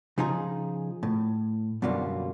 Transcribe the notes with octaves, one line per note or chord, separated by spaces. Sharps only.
C#3 F3 D#4 F4 G#4 A#5
A2
F#2 B2 D3 G3 A#3 F4